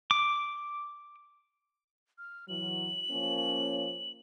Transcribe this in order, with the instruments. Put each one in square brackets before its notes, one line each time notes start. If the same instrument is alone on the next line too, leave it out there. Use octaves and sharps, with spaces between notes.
[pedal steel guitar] D6
[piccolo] F6
[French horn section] E3 F#3 [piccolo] F#7
[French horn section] F3 A#3 C#4